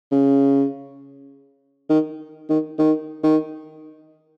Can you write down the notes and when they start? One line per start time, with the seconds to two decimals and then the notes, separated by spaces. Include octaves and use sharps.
0.12 C#3
1.90 D#3
2.49 D#3
2.79 D#3
3.24 D#3